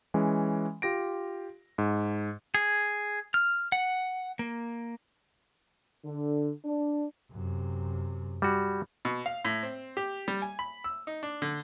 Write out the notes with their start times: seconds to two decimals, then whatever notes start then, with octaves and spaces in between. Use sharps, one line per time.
0.14 E3 G#3 C#4
0.82 F4 G4 A#6 D7
1.78 G#2
2.54 G#4
3.34 F6
3.72 F#5
4.39 A#3
6.05 D3
6.65 D4
7.32 F#2 C3
8.42 G3 F#4
9.05 B2
9.26 F5
9.45 A2
9.63 C4
9.97 G4
10.28 G3
10.42 G#5
10.59 B5
10.84 E6
11.07 D#4
11.23 D4
11.42 D3